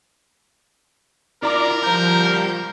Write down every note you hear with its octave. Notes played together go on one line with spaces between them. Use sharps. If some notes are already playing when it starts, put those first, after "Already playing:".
E4 F4 A#4 D5 A#5 D6
F3 G3 A#5 G6